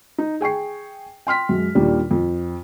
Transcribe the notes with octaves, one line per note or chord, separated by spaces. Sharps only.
D#4
G#4 G5 C#6 C7
G5 C6 F6 B6
F#2 G#3
D#2 A#2 G3 D4
F2